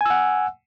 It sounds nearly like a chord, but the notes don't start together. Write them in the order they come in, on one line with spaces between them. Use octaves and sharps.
G#5 E6 F#5